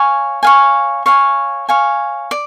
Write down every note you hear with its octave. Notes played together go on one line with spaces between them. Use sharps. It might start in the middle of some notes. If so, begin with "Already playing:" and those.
Already playing: C#5 F5 G#5
C#5 F5 G#5
C#5 F5 G#5
C#5 F5 G#5
D5